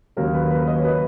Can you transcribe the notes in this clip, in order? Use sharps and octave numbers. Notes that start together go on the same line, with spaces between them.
D#2 C#3 F#3 A#4
B4
B4
A#4
D#5
C#5
F#3 B4